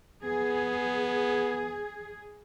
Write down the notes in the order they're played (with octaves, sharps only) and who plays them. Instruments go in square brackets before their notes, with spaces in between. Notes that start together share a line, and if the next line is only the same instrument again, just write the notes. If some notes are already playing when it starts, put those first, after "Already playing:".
[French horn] B3 [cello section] G#4